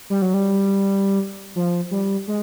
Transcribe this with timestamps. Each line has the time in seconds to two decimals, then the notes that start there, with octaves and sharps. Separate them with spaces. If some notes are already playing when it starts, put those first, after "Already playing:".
0.10 G3
0.22 F#3
0.34 G3
1.55 F3
1.91 G3
2.28 G#3